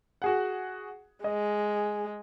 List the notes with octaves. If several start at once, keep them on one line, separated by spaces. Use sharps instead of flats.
F#4 G#4 F#5
G#3 D#5